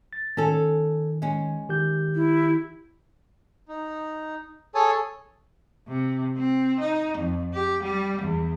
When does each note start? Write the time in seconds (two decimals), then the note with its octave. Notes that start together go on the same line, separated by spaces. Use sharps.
0.13 A6
0.37 D#3 C#4 A4
1.22 G#3 C#4
1.69 D#3 G4 G6
2.15 E4
3.68 D#4
4.75 G#4 A4 C#5 G#5 A5
5.88 C3
6.37 C4
6.80 D#4
7.18 F2
7.54 G4
7.83 G3
8.22 E2